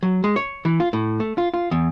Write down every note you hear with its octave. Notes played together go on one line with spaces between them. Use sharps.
F#3
G#3
C#5
E3
F4
A2
A3
F4
F4
E2